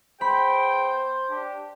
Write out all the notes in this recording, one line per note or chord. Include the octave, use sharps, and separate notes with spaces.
B3 G#4 C5 G5 B5
D4 G4